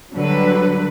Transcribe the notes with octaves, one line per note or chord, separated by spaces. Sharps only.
D3 F#3 G3 B4